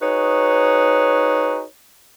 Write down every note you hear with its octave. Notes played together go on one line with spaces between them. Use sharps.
D#4 F#4 G#4 B4 C#5